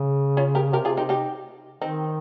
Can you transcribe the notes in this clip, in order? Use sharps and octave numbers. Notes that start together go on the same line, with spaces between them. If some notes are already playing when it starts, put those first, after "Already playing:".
Already playing: C#3
C#4 F4
G4 A#4
C3 G4 A#4
F4 G#4
D#4 G4
D#4 G4
D#3 C4 D#4